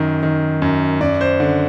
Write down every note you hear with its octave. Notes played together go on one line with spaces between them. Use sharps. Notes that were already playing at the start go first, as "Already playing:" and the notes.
Already playing: F#2 D#3
D#3
F#2
F#2 D5
C5
D3